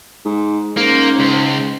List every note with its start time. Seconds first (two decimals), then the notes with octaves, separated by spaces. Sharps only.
0.25 G#2
0.77 G#2 A#3 C#4 C5
1.19 C#2